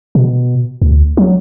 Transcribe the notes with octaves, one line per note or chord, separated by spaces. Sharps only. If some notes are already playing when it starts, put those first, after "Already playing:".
B2
D2
F#3